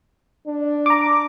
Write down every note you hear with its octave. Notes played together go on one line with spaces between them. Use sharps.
D4
A#5 D6